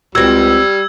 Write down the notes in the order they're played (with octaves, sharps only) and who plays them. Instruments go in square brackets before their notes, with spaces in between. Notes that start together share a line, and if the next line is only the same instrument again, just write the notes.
[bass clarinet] C#2 [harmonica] G3 [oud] C4 F#4 [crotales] E6 G#6